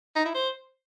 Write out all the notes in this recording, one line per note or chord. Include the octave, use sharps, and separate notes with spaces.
D#4
E4
C5